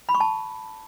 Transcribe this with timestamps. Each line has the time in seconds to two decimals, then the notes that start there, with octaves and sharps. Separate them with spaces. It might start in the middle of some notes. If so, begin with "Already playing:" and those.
0.09 B5
0.15 C#6
0.20 A5